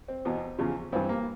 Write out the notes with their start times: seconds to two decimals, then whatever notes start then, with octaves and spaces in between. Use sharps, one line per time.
0.08 C4
0.25 E2 B2
0.59 E2 C#3 F3
0.92 G2 E3 C4
1.09 A#3